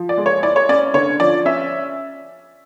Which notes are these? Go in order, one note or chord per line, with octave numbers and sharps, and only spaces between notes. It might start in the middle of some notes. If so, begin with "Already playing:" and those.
Already playing: F3
D5
G#3
C#5
E4 D5
C#5
C#4 D5
D3 C#5
F3 D5
C#4 E5